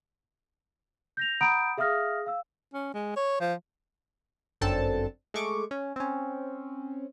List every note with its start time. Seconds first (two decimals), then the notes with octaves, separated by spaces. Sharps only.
1.17 G6 A#6 F7
1.41 F#5 A#5 B5 D#6 G6 D7
1.78 G#4 E5 F5 D#6 F6 A#6
2.26 F5 E6
2.74 C#4
2.94 G#3
3.16 C#5
3.40 F3
4.61 G1 F#2 C4 D4 A4 A5
5.34 G#3 A3 C#6 D6 D7
5.71 C#4
5.96 C4 C#4